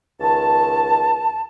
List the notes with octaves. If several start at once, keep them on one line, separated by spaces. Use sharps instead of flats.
C#2 D#3 A5